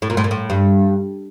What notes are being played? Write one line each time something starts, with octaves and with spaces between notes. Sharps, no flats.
A2
A#2
A2
A#2
A2
G2